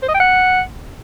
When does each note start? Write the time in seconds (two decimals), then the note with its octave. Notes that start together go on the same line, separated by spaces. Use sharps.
0.02 C5
0.08 D#5
0.14 G5
0.20 F#5